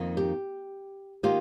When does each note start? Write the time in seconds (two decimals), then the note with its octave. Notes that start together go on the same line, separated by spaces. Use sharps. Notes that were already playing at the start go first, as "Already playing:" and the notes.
Already playing: F2 D#3 A#3 D#4
0.17 G4
1.23 D#3 A#3 F4 G4